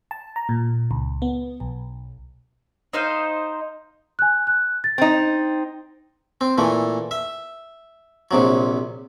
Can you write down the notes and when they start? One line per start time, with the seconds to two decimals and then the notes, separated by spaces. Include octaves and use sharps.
0.11 A5
0.36 A#5
0.49 A#2
0.91 C#2
1.22 B3
1.60 B1
2.93 D#4 C5 D#5 F5
4.19 G#5 F#6
4.47 F#6
4.84 A6
4.98 C4 D#4
6.41 C4
6.58 A#2 E3 A3
7.11 E5
8.31 A#1 C3 F#3